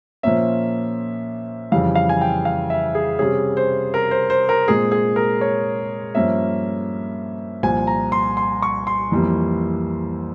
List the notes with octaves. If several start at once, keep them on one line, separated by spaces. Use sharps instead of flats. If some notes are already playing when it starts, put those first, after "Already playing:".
A#2 F3 A#3 C#4 E5
F2 C#3 E3 G3 F5
F5
G#5
G5
F5
E5
G#4
C3 G3 C#4 G#4
C5
A#4
C5
C5
A#4
A#2 G#3 C4 G#4
G#4
A#4
C#5
G2 F3 A#3 C#4 E5
C2 A#2 F3 G#5
A#5
C6
C6
C#6
C6
F2 E3 G3 A#3